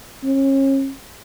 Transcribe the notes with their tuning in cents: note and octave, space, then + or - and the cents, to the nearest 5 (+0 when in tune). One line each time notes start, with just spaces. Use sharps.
C#4 -35